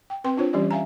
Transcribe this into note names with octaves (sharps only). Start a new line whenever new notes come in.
G5
C4 B4 G5 C6
D4 F4 C5 C#5
E3 G3 C#4 G4 D5
E5 F5 G#5 A#5